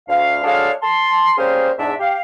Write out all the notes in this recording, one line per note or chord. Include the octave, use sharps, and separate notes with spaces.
D2 F5
G#3 D4 F#4 A4 C#5 F5
A5 C6
G3 A#3 C#4 G#4 A#4 C5
E2 G#2 D4 E5
G4 F5